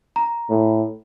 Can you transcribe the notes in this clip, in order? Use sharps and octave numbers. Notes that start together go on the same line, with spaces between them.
A#5
A2